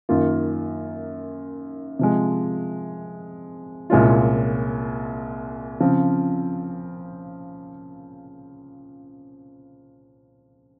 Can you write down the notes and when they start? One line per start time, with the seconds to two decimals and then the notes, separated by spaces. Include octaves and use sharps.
0.09 F#2 D#3 A#3 F4
1.99 C3 F3 G#3
3.90 C2 A#2 G#3 C#4 F4
5.80 C#3 F3 C4 F4